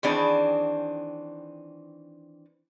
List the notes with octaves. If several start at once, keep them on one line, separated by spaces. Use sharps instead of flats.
D#3 E3 C4 D4 G#4